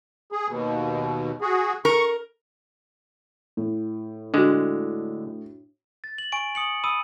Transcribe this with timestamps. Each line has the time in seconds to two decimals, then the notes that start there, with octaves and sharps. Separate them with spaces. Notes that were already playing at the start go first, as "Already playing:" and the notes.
0.32 G#4
0.48 D#2 B2
1.41 F#4 G#4
1.85 A#4 C#6
3.57 A2
4.34 D3 G#3 D4 F#4
6.04 A6
6.18 F#7
6.32 G#5 C#6 D7
6.55 D#6 C#7 F#7
6.84 B5 D#6 E6 D#7